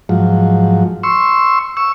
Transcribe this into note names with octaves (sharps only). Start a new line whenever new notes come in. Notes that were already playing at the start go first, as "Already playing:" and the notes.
G#2 F3 F#3
C6 C#6 E6
C#6 E6